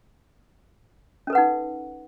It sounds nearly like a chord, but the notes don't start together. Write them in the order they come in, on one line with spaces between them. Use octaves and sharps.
C#4 A4 B4 F#5 D#4